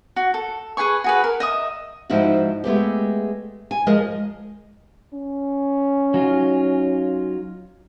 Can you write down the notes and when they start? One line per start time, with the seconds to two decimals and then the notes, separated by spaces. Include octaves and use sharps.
0.16 F#4
0.34 A4
0.77 G#4 B4 G#5 C#6
1.04 F#4 G#4 B4
1.24 A#4
1.40 D#5 E5 D#6
2.10 G#2 F3 D#4 E4 F#4
2.64 G#3 A3 B3 G4
3.71 G#5
3.86 F3 G#3 A#4 D#5
5.13 C#4
6.14 F#3 D#4 F4